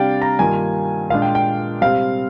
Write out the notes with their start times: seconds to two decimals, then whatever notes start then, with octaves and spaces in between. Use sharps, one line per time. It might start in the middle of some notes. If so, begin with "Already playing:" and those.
Already playing: C3 G3 D4 D5 F5 G5
0.22 A#5
0.39 G2 D#3 A#3 F4 G#5
1.10 A#2 G#3 D4 F4 F5
1.22 G5
1.35 G5
1.81 C3 G3 C4 F5